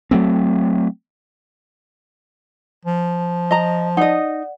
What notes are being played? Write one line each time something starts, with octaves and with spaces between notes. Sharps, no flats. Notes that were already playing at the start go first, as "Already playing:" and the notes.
F#3 A3 C4
F3
D#5 A#5
D#4 D5 D#5 F#5